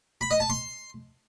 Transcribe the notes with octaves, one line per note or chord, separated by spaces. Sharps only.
B5
D#5
A5
C6